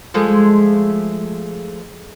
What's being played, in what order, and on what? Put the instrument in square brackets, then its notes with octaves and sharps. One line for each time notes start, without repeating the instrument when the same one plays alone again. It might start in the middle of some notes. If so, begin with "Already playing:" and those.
[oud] F3 G#3 A3